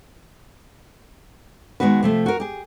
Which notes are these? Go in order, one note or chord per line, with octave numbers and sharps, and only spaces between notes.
D#3 F3 G#3 B3 F#4 B4
C3 F3 A3
F#4 A#4
G4 G#4